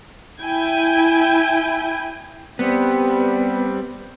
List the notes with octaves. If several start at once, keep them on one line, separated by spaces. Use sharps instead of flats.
E4 G5 G#5
G3 B3 C4